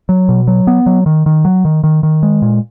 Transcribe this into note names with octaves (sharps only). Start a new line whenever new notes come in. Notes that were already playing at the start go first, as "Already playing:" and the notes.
F#3
B2
F#3
B3
F#3
D#3
D#3
F#3
D#3
D#3
D#3
G#3
A#2